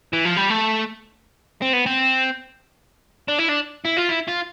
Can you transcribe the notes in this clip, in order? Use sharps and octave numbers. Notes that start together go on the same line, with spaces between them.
E3
F3
G3
A3
C4
B3
C4
D4
E4
D4
E4
F4
E4
F4